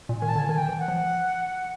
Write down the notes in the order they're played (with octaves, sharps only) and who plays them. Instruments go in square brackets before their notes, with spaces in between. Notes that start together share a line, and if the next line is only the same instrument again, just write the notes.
[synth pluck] A#2
[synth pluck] D#3 [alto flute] G#5
[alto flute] A5
[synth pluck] D3 [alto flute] G#5
[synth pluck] D#3 [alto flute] G#5
[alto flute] G5
[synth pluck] E3
[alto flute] F#5
[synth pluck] F3